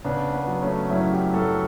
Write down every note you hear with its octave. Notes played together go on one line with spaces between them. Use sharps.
C#3 B3 D4
B3
F#3
A3 C#4
F#2 C#4 E4
E4 G4
F#2 F#4 A4